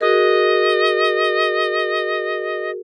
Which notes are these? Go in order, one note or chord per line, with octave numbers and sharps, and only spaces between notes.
F#4 G#4 A#4 D#5